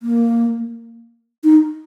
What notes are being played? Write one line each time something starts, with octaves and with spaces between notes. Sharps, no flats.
A#3
D#4